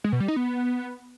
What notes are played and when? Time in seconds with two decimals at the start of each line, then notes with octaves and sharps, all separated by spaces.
0.04 G#3
0.12 B2
0.20 G3
0.28 D#4
0.36 B3